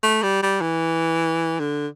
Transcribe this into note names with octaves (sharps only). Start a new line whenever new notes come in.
A3
G3
G3
E3
D3